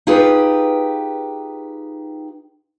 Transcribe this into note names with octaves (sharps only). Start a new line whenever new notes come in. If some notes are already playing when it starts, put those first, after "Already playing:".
D#4 F4 G4 G#4 B4